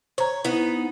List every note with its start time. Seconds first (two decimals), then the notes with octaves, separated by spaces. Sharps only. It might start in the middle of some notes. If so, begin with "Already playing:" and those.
0.18 C5 C#5 A#5
0.45 B3 D#4 E4